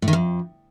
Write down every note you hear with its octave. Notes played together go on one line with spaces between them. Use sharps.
A2
D#3
F2